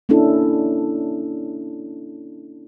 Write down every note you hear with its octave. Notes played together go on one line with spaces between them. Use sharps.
A#3 C#4 D4 E4 A4